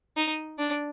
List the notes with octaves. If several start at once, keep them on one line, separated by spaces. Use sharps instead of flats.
D#4
D4